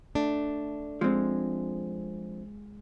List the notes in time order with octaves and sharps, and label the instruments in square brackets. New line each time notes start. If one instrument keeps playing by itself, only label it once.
[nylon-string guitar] A3 D4
[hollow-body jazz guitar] F3 C4 [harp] G#3